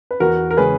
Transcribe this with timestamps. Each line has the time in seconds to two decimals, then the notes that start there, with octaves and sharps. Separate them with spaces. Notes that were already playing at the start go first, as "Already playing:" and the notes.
0.11 B4
0.20 E2 F#4 A#4
0.51 A#4
0.57 C#3 G#3 C#4 G#4 B4